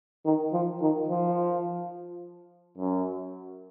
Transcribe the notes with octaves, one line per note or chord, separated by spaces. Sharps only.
D#3
F3
D#3
F3
F#2